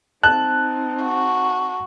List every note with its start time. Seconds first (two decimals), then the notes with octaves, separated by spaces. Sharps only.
0.23 C4 D#4 A5 F#6
1.03 F#4